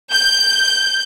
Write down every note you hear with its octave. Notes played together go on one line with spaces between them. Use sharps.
G6